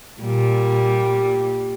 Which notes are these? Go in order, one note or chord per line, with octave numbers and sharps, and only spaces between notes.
A#2 G3